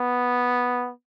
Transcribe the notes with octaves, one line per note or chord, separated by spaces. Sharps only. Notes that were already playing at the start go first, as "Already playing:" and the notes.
Already playing: B3